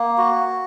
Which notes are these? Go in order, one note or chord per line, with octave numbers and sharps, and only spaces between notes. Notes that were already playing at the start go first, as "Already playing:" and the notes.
Already playing: A#3
F#4